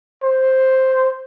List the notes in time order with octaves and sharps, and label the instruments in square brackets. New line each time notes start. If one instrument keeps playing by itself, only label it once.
[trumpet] C5